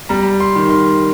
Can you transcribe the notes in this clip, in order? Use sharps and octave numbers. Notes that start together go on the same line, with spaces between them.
G3 A#5
C6
D#3
C6